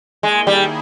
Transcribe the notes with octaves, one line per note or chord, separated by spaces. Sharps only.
D#3 G#3 A#3 E4 G#4
G3